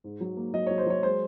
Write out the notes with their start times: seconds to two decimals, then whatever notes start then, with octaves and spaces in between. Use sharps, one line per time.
0.04 G#2
0.21 F#3
0.37 A#3
0.54 F#3 D#5
0.67 C#5
0.70 F#3
0.78 C5
0.86 F#3 C#5
1.03 G#3 C5